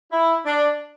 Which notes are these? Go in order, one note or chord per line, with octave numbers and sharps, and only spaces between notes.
E4
D4